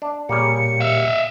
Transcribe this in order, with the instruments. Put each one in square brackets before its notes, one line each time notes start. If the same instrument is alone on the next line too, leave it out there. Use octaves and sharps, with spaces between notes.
[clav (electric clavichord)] D4
[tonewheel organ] A#2 G4 [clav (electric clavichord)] C#3 G3 A#3 [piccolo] C#7
[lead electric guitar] E5 F5